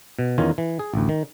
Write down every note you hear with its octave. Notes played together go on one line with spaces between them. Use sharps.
B2
E2 D#3 C#4 F4 G#5
E3
G#4
A1 D2
D#3